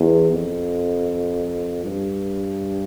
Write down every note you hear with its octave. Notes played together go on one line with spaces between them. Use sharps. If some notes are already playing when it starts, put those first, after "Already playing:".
Already playing: E2
F2
G2